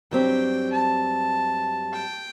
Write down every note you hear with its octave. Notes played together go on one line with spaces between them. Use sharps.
G2 F#3 C4 G4 G5
A5
G5